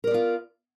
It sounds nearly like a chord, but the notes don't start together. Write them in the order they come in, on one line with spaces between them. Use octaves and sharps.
A#4 D5 B3 F4